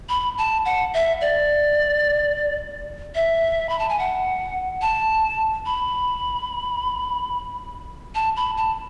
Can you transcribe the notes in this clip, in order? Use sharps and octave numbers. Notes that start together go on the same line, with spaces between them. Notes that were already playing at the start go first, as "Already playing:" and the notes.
B5
A5
F#5
E5
D5
E5
B5
A5
G#5
F#5
A5
B5
A5
B5
A5